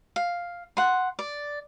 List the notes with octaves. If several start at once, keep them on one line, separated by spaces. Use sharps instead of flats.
F5
F#5 C6
D5